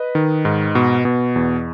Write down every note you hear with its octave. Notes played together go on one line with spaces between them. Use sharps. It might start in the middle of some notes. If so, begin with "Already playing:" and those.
Already playing: B4 D#5
D#3
G#2
B2
B2
E2